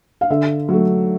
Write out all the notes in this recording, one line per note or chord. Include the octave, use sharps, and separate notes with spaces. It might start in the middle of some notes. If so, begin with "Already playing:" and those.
F5
D3 E5
F#3 A3